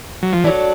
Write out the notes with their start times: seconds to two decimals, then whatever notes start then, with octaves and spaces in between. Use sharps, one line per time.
0.23 F#3
0.33 F3
0.44 E3 F#3 A3 D4